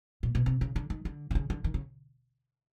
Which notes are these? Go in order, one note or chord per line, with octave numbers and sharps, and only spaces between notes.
A#2
B2
C3
C#3
D3
D#3
D3
C3
C#3
D3
D#3
C#3